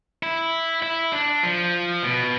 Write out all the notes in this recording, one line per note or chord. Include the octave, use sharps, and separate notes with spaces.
E4
E4
D4
F3
B2